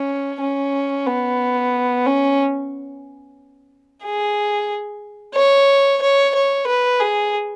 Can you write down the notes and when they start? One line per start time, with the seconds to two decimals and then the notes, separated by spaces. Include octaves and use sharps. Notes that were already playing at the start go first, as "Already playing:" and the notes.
Already playing: C#4
0.41 C#4
1.07 B3
2.07 C#4
4.04 G#4
5.36 C#5
6.02 C#5
6.35 C#5
6.67 B4
7.00 G#4